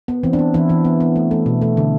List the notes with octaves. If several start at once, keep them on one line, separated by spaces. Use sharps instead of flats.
B3
E3 C4
D4
B3
E3 E4
E3
B3
B3
A3
A3
B2
A3
D3